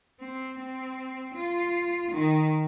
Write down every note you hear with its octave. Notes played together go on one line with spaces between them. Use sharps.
C4
C4
F4
D#3